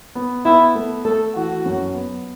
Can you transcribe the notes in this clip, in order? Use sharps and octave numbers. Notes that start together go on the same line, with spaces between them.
B3
B3 E4
A3
A3 A4
E3 F#4
F#2
B3